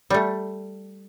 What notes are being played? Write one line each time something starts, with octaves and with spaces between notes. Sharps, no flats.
G3 A3